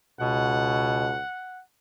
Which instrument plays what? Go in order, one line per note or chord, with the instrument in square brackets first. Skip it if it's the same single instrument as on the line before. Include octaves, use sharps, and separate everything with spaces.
[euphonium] C#2 [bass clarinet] B2 [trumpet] F#5